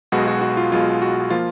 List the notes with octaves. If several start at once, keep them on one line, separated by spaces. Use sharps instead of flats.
B1 B2 G#3 F#4
F#4
F#4
F4
B1 B2 G#3 F4
F#4
F3 A#3 F4